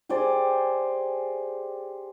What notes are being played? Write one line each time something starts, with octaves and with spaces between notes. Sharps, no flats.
G4 G#4 C5 D5